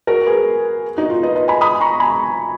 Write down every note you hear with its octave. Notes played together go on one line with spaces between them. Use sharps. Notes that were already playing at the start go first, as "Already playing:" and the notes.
F#4 A#4
G#4 B4
D#4 F#4
F4
B4 D#5
B4 D#5
G#5 B5
B5 D#6
A#5 C#6
G#5 B5